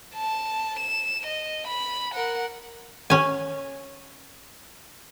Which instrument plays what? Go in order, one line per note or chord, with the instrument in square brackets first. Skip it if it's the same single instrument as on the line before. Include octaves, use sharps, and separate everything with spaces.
[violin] A5
E7
D#5
B5
A#4 F#5
[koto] C#4 G#5